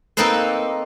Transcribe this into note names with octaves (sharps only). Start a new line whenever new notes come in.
A#3 C4 D#4 A4 B4 C5